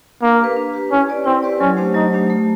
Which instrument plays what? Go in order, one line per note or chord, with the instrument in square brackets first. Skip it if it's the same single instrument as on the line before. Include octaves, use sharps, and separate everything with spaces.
[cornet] A#3 [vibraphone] D4
[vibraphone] G4 B4
D4
G4 B4
[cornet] C#4 [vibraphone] E4
[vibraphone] G4 B4 D5
[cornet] C4 [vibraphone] E4
[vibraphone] G4 B4 D5
[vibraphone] F#3 [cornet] C#4
[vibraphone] A3 D4 G4 C5
[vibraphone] F#3 [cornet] D#4
[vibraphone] A3 D4 G4 C5
A3